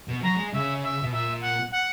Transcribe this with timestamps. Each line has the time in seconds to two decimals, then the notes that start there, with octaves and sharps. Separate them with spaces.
0.09 B2
0.23 F#3 A#5
0.38 G#3
0.53 C#3 E5
0.83 E5
1.02 B2
1.12 A#2 E5
1.41 F#5
1.72 F#5